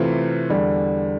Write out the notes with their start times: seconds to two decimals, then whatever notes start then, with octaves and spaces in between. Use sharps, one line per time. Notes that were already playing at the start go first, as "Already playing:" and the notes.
Already playing: C3 E3 A3 C4 F4
0.50 E2 D3 G3